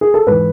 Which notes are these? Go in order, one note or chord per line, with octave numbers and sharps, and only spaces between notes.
G#4
A4
G#2 E3 B4